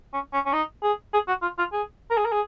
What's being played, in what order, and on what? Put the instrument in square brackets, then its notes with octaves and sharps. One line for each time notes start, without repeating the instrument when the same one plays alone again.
[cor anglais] C#4
C#4
C#4
D#4
G#4
G#4
F#4
F4
F4
G#4
A#4
G#4
A#4
G#4